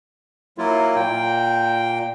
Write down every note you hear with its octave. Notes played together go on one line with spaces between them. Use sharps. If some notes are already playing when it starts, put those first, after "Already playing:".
F#3 A#3 E4 F4
A#2 G5